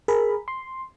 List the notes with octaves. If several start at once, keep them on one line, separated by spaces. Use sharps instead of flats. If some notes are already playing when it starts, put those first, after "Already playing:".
G#4 A#4 B5
C6